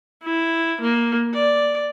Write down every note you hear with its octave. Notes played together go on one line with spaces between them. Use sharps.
E4
A#3
D5